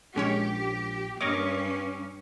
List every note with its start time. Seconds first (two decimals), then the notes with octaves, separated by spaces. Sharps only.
0.16 A#1 G#3 C#4 G4 C#5
1.21 G2 C#4 A#4 C#5 D#5 C#6 D6